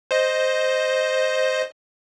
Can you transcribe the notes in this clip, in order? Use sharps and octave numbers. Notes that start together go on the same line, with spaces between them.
C5 D#5